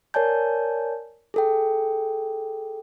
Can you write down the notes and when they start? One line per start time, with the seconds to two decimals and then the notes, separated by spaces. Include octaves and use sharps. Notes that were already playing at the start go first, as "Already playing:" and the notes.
0.14 A#4 C#5 D5 G#5 A5 G6
1.34 G#4 A4 G5